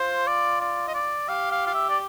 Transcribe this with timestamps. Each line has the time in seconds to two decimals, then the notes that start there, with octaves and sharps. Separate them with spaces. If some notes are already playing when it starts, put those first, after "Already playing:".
Already playing: F4 C5
0.27 D5
0.61 D5
0.87 D#5
0.94 D5
1.29 G4 F5
1.52 F5
1.67 F5
1.74 E5
1.90 D5